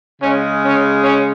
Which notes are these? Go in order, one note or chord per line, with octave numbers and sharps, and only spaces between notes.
C#3 G#3 C#4
C#4
C#4